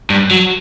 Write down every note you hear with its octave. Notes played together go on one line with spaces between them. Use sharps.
G2
F#3